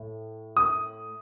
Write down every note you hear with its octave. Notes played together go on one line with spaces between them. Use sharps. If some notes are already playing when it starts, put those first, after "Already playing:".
Already playing: A2
D#6